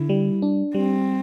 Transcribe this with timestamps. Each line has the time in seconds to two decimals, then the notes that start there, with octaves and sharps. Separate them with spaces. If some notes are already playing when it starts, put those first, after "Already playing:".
Already playing: D3 E4
0.09 G3
0.42 D4
0.74 G3 C4